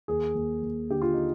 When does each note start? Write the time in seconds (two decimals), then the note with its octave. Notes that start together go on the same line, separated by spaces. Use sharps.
0.08 D#2 G#4
0.35 D#2
0.62 D#2
0.90 D3 G4
1.02 F4
1.13 D#4